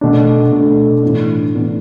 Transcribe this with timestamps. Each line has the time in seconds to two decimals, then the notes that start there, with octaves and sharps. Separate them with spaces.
0.01 B2 A3 D4
0.52 B2 A3 D4
1.03 A2 E3 B3 D4
1.54 A2 E3 B3 D4